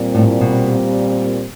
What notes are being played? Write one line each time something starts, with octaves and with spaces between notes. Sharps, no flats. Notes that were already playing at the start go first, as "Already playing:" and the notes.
Already playing: A#2 G3 C4
A2
B2